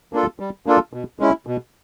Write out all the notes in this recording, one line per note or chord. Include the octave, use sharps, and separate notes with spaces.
A#3 D4 F4 A4
G3
A#3 D4 F4 A4
B2
G#3 C#4 E4
B2